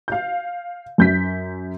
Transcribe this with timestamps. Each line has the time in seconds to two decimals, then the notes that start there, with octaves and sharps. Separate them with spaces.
0.08 F5 G6
0.98 F#2 G6 B6